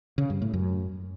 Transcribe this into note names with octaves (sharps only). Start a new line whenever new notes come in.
C#3
G2
A2
F#2